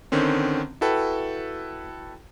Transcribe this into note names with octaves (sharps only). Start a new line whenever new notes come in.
D3 D#3 C4 C#4
E4 F#4 A4 B4 G5